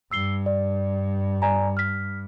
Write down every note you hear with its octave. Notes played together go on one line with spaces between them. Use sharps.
G2 E6 C7 G7
D5
D5 G#5 A#5
F6 B6